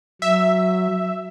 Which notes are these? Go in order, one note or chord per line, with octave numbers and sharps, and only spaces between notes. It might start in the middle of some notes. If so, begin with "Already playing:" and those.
F#3 E5